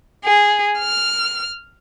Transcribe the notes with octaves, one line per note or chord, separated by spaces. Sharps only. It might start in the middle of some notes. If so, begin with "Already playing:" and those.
G#4
F6